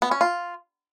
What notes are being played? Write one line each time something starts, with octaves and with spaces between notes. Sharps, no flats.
B3
C#4
F4